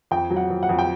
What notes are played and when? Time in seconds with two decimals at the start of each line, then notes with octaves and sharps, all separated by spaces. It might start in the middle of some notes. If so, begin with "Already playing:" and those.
0.11 F2 G5
0.30 F#3
0.36 F#5
0.50 F2
0.63 F#5
0.69 F2
0.79 G5